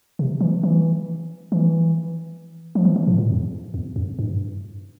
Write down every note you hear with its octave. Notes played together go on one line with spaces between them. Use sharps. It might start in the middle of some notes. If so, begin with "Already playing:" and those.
C3
E3
E3
E3
F3
E3
E3
A2
A2
F2
E2
F2
G2